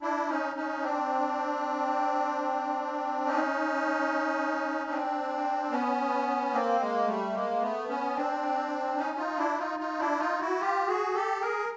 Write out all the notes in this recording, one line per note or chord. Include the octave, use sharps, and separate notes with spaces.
D4 E4
C#4 D#4
C#4 D#4
C4 D4
C#4 D#4
C4 D4
B3 C#4
A#3 C4
G#3 A#3
G3 A3
G#3 A#3
A3 B3
B3 C#4
C4 D4
C#4 D#4
D#4 F4
D4 E4
D#4 F4
D#4 F4
D4 E4
D#4 F4
E4 F#4
F4 G4
F#4 G#4
G4 A4
G#4 A#4